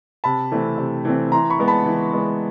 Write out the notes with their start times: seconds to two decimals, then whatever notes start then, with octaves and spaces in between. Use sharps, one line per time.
0.24 C3 A5 B5
0.51 E3 A3 C4
0.78 C3
1.05 E3 A3 C4
1.32 E3 A#5 C6
1.50 B5 C#6
1.59 G#3 B3
1.68 A5 B5
1.86 E3
2.13 G#3 B3